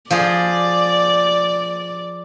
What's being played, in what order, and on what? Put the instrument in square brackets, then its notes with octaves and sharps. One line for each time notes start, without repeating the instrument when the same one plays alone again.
[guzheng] F3 F4 G#4 [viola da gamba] D5